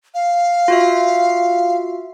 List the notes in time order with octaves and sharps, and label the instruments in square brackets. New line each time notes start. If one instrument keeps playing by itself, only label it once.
[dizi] F5
[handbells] F4 F#4 E5